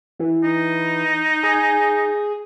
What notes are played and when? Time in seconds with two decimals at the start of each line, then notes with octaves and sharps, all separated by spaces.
0.19 E3
0.44 D#4
1.43 G#4